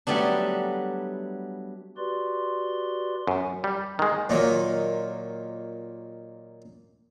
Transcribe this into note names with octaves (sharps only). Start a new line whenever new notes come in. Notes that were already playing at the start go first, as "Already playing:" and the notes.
F#3 G3 A3 B3 D4
F#4 G4 B4 D5 C6
F#2
G3
D#3 G#3
A#2 D#3 F#3